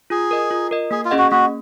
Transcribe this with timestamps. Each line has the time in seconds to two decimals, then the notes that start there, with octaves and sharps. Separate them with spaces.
0.10 F4 G#4
0.31 A#4 D#5
0.51 F4
0.71 A#4 D#5
0.91 A#3 G#4
1.05 F4
1.11 C#4 G#4 D#5 F#5
1.18 F#4
1.31 A#3 F#4